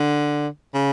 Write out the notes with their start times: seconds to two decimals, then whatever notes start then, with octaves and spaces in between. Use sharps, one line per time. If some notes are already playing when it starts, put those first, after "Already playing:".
Already playing: D3
0.74 C#3